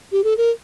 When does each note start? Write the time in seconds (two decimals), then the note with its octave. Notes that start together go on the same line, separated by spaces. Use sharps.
0.12 G4
0.24 A4
0.37 A#4